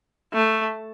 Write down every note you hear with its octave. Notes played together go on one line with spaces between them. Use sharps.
A3